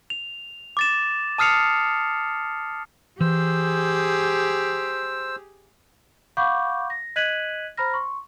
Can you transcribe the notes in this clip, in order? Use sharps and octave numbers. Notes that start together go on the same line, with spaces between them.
F7
D6 A6 E7
A5 D#6 F6 C7 C#7 F7
E3 G4 G#4 C5 E6
F5 F#5 B5 C#6 D6 G6
A#6
D#5 F#6 G#6 B6 D#7 F#7
C5 A#5 B5 F6 A#6
C6 C#6